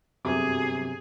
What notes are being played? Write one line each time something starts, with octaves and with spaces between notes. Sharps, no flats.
G1 F#2 C3 G#4 D6